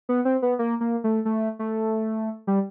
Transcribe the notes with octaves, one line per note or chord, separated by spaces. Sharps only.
B3
C4
B3
A#3
A#3
A3
A3
A3
G3